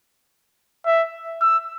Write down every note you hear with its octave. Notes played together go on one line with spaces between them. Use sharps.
E5
E6